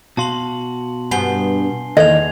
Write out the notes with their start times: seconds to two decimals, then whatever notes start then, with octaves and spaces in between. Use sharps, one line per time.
0.17 B2 F#4 F5 A5 C6 F#7
1.11 G2 B3 G#5 C7 G7
1.97 E2 D#3 E3 A#3 D#5 G#6 F7